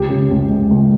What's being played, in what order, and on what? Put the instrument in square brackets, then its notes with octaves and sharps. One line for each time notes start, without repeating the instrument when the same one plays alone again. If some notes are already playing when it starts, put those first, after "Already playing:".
Already playing: [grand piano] C#2 G4
C#3
C#2
G#3
C#2